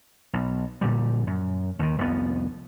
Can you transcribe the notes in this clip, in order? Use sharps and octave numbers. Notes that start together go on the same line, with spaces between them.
B1
A#1 A#2 D3 G3
F#2
D#2 D#3
F1 C2 F2 B3